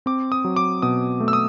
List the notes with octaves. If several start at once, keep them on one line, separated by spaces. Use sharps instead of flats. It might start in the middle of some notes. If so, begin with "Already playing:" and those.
C4 D6
D#6
F#3
D6
B2 D#6
A3
E6
D#6